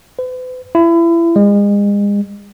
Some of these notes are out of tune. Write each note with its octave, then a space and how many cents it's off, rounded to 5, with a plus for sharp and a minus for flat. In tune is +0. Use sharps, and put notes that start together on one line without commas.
B4 +45
E4 +30
G#3 -35